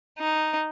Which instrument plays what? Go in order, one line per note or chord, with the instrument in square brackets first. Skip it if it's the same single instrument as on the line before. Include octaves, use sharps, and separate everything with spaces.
[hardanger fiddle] D#4